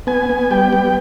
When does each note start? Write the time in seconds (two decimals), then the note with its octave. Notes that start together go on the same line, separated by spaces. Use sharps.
0.07 B3 G#5
0.29 B3
0.51 G3 G5
0.73 B3